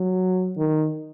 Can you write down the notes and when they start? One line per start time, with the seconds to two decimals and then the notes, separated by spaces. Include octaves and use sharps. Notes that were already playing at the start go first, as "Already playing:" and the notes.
Already playing: F#3
0.57 D#3